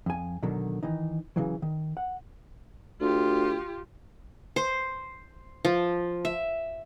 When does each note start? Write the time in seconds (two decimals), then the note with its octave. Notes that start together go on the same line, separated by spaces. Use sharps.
0.06 F2 G#5
0.43 B2 D3 D#3 F#3
0.83 D#3 E3 D#4
1.36 C#3 E3 F#3
1.62 D#3
1.97 F#5
3.01 D2 F4 G4
4.56 C5
5.65 F3
6.25 E5